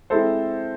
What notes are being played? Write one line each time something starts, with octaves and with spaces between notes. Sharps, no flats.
G#3 C4 E4 A4 C5